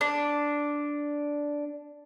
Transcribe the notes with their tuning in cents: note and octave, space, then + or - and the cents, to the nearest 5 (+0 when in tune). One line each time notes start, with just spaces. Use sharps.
D4 -5